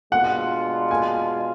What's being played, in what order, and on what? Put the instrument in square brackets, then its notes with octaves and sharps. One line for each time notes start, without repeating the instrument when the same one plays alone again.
[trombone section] B2 G#3 D4 F4 [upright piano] F#5
[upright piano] G#5